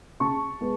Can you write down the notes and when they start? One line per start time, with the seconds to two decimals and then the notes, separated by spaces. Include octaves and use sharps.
0.20 C#3 A5 C#6
0.61 G#3 B3